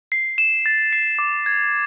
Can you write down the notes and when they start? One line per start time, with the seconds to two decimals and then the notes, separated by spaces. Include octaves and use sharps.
0.12 C7
0.38 E7
0.66 A6
0.93 C7
1.19 D6
1.46 G#6